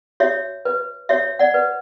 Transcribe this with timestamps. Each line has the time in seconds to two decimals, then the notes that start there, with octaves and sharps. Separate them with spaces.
0.20 F#4 C#5 E5
0.65 B4
1.09 F#4 C#5 E5
1.39 D5 F#5
1.54 B4